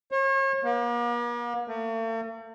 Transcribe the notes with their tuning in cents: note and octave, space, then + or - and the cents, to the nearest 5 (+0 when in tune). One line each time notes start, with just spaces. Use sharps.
C#5 -40
A#3 +45
A3 +45